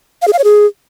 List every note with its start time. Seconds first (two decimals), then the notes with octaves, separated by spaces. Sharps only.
0.22 F5
0.27 G#4
0.33 F5
0.39 C#5
0.44 G#4